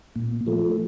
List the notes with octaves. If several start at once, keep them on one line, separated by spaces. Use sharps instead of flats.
A#2
F3 A3